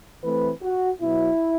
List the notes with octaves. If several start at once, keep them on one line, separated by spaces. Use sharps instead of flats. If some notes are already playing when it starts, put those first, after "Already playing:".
E3 A3 C4 B4
F#4
B2 F#3 B3 E4